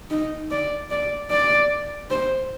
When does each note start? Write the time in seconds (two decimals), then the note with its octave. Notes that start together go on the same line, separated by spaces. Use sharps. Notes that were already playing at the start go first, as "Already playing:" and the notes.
0.11 D#4
0.51 D5
0.91 D5
1.30 D5
2.10 C5